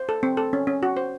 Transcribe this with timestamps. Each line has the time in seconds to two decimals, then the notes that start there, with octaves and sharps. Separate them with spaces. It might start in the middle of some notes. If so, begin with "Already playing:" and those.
Already playing: C5
0.09 A4
0.23 C4
0.37 A4
0.53 C#4
0.67 C#4
0.83 F#4
0.97 C5